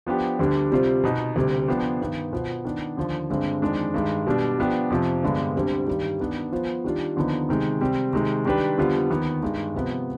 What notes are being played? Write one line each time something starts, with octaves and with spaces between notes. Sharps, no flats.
F3 B3 D4 G4
D2 D3 G3 D4
C3 G3 C4 F4 C5
B2 B3 D#4
D2 C3 G3
F3 B3 D4 G4 C5
G2 D#3 B3
B2 B3 F4 C5
D#3 B3 D4
D#2 D3 F3
G2 D3 G#3 C4
F2 D#3 G#3 D4
G2 D#3 G#3
B2 G3 D4
F3 B3 D4 G4
F2 C3 F3
G2 D3 G#3 B3
D2 D3 G3 C4
G2 D#3 G3
D#3 B3 D4
F3 B3 F4 C5
D#3 G3 D4 F4
D#2 D3 F3 B3 D#4
C3 D#3 G#3
C3 G3 C4 G4
C3 D#3 G#3
D#3 G3 D4 G4 B4
F2 D3 G3 B3 F4
D#2 D#3 B3
G2 D#3 G#3
C3 F3 B3